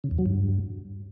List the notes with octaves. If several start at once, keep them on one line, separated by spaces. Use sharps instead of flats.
C#3
E2
F#3
G2